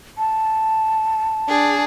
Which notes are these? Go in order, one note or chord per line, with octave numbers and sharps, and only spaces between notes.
A5
D4 G#4